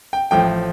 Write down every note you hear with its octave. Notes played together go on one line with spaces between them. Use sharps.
G5
A1 A2 F3 G5